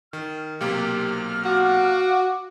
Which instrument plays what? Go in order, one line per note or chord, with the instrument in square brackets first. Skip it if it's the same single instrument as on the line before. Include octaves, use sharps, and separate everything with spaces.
[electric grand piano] D#3 [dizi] F6
[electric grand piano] B1 C3 A#3 [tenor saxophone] G4 [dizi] F6
[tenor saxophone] F#4 [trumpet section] F5 F#5 D6